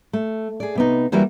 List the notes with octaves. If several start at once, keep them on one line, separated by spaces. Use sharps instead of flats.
A3
G#4 D5
C3 B3 D#4
E3 G3 A#3 E4 F#4